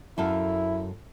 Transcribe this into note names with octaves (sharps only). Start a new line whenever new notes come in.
F#2 E4 A4 F5